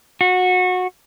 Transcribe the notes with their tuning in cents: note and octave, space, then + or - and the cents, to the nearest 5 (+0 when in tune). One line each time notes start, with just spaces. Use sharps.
F#4 -20